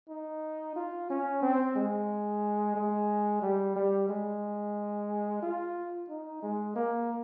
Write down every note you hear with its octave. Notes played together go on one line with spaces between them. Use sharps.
D#4
F4
C#4
C4
G#3
G#3
G3
G3
G#3
F4
D#4
G#3
A#3